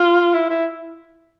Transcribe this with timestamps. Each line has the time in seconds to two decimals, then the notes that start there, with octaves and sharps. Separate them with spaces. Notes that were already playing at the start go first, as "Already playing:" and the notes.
Already playing: F4
0.34 E4
0.50 E4